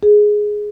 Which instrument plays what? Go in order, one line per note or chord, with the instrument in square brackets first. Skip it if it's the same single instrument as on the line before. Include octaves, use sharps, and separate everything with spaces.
[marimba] G#4